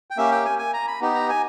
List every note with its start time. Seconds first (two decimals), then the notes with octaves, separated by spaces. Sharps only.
0.11 G5
0.17 A#3 C#4 G4 E5
0.31 G5
0.45 G#5
0.59 G#5
0.74 A#5
0.87 B5
1.01 B3 D#4 G4
1.15 A#5
1.29 G#5